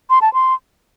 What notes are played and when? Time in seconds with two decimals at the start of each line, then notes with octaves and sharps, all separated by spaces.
0.10 C6
0.22 A5
0.34 C6